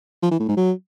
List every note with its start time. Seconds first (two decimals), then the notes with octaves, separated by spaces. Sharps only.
0.22 F3
0.31 E3
0.40 A2
0.48 G#2
0.57 F#3